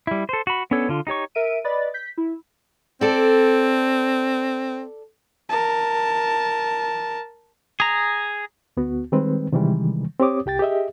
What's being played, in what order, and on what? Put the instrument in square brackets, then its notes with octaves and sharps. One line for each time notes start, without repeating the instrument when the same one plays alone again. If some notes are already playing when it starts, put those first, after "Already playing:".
[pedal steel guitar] G3 E4
A4 C5
F#4 B5
B3 C#4 D4 A4 C#5
D3 F4
D#4 G4 C#5 C#6
[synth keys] A#4 E5 D7 D#7
B4 D5 D#5 B5 A6
G6 B6
E4
[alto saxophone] C4 [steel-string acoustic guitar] A4 D5
[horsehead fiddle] A#4 A5
[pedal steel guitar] G#4 A#5
[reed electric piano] D2 B3 F#4
D#3 G3 G#3 C4 B4
C3 D#3 E3 G3 G#3
C4 G4 C#5 D6 D#6
C2 G4 G5 A6
G4 G#4 D#5 E5